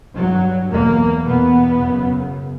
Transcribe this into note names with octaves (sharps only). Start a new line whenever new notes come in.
G2 F#3
E2 B2 A#3
E2 B2 B3
F#2 C#3